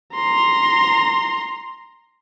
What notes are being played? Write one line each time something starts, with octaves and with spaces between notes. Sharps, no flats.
A#5 C6